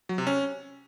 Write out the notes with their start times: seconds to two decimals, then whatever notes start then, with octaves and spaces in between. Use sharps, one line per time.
0.09 F#3
0.18 C3
0.27 C#4